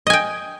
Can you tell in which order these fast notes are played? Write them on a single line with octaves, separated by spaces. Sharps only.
D#5 G#5 G5